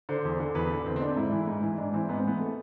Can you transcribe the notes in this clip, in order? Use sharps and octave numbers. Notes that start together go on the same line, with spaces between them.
D3 C5
E2
D3
E2 B4
D3
E2 C4
C4
D3 D4
G#2 E4
E3
G#2
E3
G#2 D4
E3 C4
G#2 B3
C4
E3 B3
A3